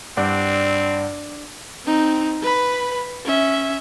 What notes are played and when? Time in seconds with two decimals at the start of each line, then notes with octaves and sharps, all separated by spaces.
0.17 G2 C4 D4 D5 F#5
1.85 C4 D#4
2.42 B4 B5
3.25 C#4 E5